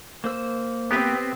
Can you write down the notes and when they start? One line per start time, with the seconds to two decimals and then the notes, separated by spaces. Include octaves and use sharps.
0.24 A#3 C5 E6
0.91 B3 C4 G4 B4